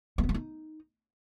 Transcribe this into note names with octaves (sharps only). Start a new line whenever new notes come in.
A3
B3
A3
D#4